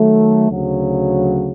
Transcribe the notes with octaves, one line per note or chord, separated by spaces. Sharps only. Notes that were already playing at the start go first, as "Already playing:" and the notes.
Already playing: D#3 F#3 A3
D2 C#3 F#3